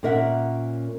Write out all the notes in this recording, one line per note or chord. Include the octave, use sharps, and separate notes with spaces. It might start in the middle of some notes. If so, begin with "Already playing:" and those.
A#2 C#4 A#4 E5 F#5